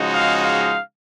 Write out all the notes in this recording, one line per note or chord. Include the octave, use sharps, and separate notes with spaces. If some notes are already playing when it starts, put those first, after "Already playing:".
Already playing: C#3 F3 G#3 D#4 F#4
F5
F5